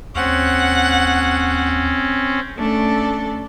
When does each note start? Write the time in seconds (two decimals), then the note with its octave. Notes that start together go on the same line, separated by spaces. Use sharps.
0.15 D#2 C4 C#4 F#5
2.57 A3 C#4 D4 A4 D5